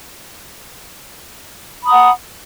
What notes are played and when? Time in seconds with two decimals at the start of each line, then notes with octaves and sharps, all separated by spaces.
1.83 B5
1.85 A#5
1.88 D#6
1.91 F#5